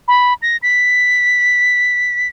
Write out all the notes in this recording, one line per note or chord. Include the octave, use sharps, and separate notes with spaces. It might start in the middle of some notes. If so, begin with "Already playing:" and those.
B5
A#6
B6